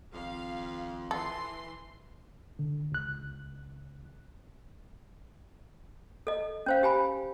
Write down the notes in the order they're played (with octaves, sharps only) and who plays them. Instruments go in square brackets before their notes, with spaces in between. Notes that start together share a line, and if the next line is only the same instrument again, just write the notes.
[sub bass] G#1 [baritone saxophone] F2 [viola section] F5
[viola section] E3 C6 [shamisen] A4
[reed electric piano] D3
C#2 F#6
[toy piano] A4 D#5
C#4 C5 F5
G4 G#5 B5